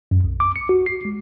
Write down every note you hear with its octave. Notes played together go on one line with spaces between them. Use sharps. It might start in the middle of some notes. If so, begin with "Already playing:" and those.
F#2
B1
D6
C#7
F#4
C7
G#3